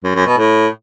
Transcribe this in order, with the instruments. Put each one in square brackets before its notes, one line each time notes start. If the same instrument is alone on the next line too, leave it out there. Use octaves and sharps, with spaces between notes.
[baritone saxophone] F#2
F#2
B2
A2